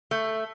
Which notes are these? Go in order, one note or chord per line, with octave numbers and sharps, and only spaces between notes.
A3